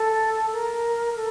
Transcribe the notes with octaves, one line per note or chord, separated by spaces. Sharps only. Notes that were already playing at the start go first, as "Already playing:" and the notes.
Already playing: A4
A#4
A4